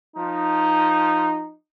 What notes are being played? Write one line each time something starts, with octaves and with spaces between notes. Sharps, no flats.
F3 D#4